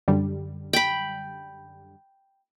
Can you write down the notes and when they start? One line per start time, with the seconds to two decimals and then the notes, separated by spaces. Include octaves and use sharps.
0.08 F#2 D3 G3
0.73 G5 B5